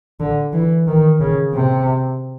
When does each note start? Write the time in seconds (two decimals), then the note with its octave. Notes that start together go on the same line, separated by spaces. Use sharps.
0.20 D3
0.53 E3
0.88 D#3
1.20 C#3
1.54 C3